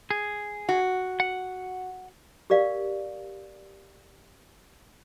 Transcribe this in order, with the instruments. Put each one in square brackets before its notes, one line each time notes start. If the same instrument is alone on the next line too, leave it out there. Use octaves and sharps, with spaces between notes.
[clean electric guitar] G#4
[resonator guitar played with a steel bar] F#4
[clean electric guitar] F#5
[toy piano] G4 A#4 D5 F5